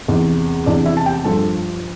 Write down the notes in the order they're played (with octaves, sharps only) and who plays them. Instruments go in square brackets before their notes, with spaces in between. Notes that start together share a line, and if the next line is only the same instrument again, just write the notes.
[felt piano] E2 C3 E3
E2 C3 E3 D4 D5
E4 E5
A5
G4 G5
G2 F3 A4 A5